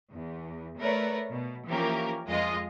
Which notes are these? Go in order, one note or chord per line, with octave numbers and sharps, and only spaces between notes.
E2
A3 A#4 B4 C#5 D5
B2
E3 F3 A#3 C#4 G4 A#4
F2 G#3 F4 D#5